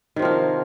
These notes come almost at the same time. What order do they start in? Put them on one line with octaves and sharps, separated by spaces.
D#3 C3 F3 A#3